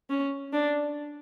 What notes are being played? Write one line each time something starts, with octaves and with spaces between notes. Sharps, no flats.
C#4
D4